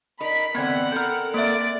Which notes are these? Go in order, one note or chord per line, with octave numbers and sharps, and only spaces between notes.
D#4 A#4 B5 B6
B2 D3 E3 B3 C4 F#5 G#6
A4 A#4 F6 G6
A#3 D5 E5 D7